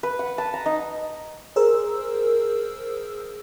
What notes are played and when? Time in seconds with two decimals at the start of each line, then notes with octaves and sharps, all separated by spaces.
0.03 B4
0.19 F#5
0.38 A5
0.54 A#5
0.66 D#4
1.56 G#4 A#4 C5 E6